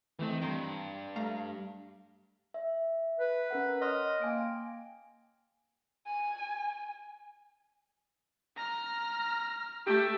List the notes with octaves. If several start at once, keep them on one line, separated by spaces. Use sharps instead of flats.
D#3 E3 A3 C4 D#4
G2 G5 A#5 C6
A3 F5 A#5
E5
B4
C#4 A#4 F#5
C#5 D#5 C6 F6
A#3 G5 G#5 D7
G#5
A#5 F6
A3 G4 E6